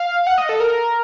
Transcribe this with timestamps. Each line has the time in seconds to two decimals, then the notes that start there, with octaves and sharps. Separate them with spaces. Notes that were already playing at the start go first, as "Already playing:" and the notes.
Already playing: F5
0.27 F#5
0.38 D#5
0.49 A4
0.60 A#4